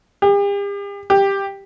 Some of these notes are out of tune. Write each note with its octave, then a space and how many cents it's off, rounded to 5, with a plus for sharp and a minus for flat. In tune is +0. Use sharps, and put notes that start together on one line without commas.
G4 +45
G4 +10